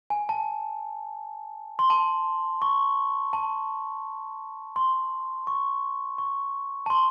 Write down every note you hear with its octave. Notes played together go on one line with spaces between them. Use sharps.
G#5
A5
C6
A5
C#6
A5
C6
C#6
C#6
A5
C6